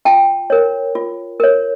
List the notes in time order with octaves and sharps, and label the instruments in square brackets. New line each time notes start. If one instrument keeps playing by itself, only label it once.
[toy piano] F4 G5 A5
A#4 C#5
F4
A#4 C#5